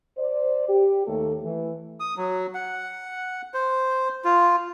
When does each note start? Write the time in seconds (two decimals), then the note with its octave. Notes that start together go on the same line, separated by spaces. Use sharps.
0.17 C5 D5
0.68 G4
1.06 D#2 A3 A4
1.42 E3 A3
2.00 D#6
2.17 F#3
2.54 F#5
3.54 C5
4.24 F4